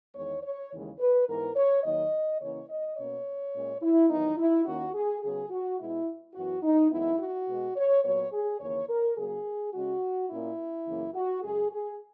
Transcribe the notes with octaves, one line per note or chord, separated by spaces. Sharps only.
E2 D#3 G#3 B3 C#5
C#5
D#2 C#3 E3 G#3
B4
G#2 E3 B3 A#4
C#5
D#2 D#3 F#3 A#3 D#5
C#3 E3 A#3 C#4 C#5
D#5
B2 A#3 C#4 C#5
A#2 G#3 C#4
E4
E2 D#3 F#3 B3 D#4
E4
D#2 D#3 A#3 C#4 F#4
G#4
C#3 F#3 B3 G#4
F#4
B2 G#3 B3 E4
F#2 E3 B3 F#4
D#4
F#2 E3 G#3 B3 E4
F#4
B2 G#3 B3
C#5
A#2 F#3 B3 C#5
G#4
D#2 C#3 E3 A#3 C#4 C#5
A#4
C#3 F#3 A#3 G#4
C#3 G#3 C#4 F#4
A#2 A#3 C#4 E4
F#2 C#3 E3 A#3
F#4
F#2 C#3 G#3 G#4
G#4